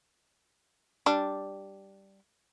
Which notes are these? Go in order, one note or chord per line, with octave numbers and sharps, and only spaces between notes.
G3 D4